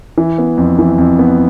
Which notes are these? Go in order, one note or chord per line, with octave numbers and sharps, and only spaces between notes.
E3
B3
F2
E3
F2
B3